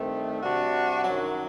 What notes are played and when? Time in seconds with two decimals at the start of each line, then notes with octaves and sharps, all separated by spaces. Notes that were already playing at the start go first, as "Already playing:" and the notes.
Already playing: G2 D#3 A3 C4
0.41 C3 G3 D4 F#4
1.04 F#2 D#3 F#3